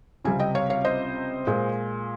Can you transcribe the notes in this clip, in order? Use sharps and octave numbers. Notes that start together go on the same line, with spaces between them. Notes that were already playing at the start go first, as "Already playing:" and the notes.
C#2 C3 G3 C4 F5 G#5
D#5 G5
C#5 F5
C#5 F5
C5 D#5
A#2 G#3